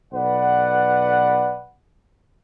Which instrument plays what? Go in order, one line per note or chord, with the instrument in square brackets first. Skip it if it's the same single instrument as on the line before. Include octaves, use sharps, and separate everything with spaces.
[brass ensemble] B1 B4 D5 F#5